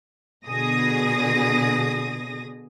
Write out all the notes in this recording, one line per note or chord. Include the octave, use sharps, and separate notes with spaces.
B2 D3 G#4 D#6 A#6